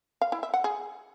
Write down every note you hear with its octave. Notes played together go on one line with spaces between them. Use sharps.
F5
E4
E5
F#5
G#4